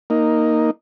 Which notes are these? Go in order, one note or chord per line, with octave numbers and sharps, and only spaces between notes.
A#3 D#4